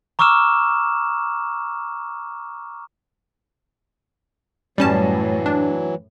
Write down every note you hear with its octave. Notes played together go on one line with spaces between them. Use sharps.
A#5 C#6 D6 E6 F6 E7
F#2 A2 E3 F#3 G3 C#4 A5
D4